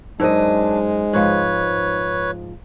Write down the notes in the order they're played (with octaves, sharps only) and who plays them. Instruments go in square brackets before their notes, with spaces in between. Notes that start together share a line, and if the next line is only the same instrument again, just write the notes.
[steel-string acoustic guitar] F#2 D#5 [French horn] G#3 [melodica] D4 [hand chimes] D#4 C5
[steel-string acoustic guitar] G#2 F3 [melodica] B4 C#5